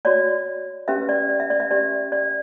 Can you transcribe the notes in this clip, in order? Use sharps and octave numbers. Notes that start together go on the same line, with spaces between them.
F#4 C#5 D5
C#4 G4 B4 E5
D5
D5
E5
D5
E5
C#4 G4 B4 D5
D5